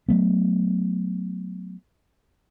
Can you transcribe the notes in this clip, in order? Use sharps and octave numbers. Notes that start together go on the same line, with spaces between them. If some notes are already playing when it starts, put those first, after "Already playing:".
F#3 A3 B3